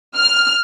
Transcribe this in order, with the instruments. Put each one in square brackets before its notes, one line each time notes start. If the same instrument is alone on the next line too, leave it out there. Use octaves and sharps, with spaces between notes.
[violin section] F6